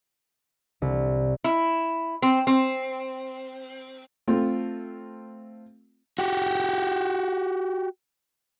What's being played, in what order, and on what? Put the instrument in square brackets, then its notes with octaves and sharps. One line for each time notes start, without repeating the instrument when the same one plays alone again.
[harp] C2
[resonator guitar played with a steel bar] E4
C4
C4
[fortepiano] A3 C4 F4
[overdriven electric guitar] F#4 G4